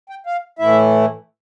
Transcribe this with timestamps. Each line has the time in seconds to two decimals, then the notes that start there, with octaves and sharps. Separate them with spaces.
0.10 G5
0.26 F5
0.59 A2 E3 A3 E4 E5